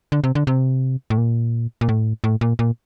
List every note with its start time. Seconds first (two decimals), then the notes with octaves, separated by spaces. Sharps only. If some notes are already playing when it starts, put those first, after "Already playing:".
0.12 D3
0.24 C3
0.35 D3
0.47 C3
1.10 A2
1.18 A#2
1.81 A#2
1.89 A2
2.24 A2
2.41 A#2
2.59 A#2